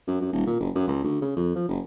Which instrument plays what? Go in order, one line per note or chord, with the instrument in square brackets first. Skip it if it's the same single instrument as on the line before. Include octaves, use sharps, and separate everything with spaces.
[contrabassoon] F#2
F#2
D#1
A#2
F#1
F#2
C#2
D2
C#3
F2
F3
F#1